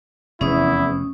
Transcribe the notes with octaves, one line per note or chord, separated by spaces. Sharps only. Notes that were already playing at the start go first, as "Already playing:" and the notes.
F1 E2 C3 C#4 E4 D#6